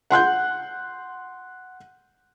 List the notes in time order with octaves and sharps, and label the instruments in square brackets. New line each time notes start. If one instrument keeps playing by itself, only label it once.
[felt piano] F#5 C6 F#6 G6